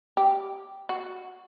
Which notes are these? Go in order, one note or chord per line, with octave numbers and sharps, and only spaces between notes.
G4
F#4